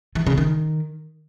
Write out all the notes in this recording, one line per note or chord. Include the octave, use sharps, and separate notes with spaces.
E3
C#3
D#3